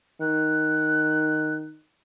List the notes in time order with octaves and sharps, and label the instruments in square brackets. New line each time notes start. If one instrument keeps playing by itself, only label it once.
[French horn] D#3 [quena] F#6